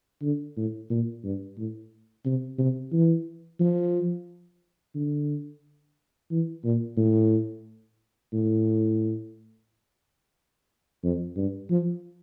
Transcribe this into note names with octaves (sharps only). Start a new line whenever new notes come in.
D3
A2
A#2
G2
A2
C3
C3
E3
F3
D3
E3
A#2
A2
A2
F2
G2
F3